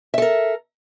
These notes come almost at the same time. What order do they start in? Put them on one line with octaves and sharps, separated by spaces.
E5 A4 A#4